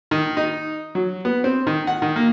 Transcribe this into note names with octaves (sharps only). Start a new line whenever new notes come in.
D#3
D#4
F#3
B3
C4
D#3
F#5
D#3
A#3